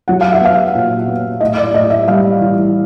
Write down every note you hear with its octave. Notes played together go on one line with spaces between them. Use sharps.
F#3 F#5
F5
E5
B3 F5
A#2
B3
A2 D#5
D5
A2 D#5
E5
G3 F5
E3